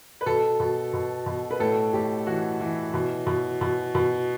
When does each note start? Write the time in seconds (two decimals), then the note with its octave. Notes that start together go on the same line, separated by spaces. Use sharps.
0.21 B4
0.26 B2 A4
0.60 B2
0.93 B2
1.26 B2
1.51 B4
1.60 A2 A4
1.93 A2 G4
2.27 E3 F#4
2.60 E3
2.94 B2
3.27 B2
3.61 B2
3.95 B2